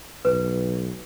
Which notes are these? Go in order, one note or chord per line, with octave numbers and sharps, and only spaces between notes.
B1 B4